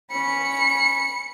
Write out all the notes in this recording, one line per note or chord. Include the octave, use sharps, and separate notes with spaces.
C#4 B5 C#7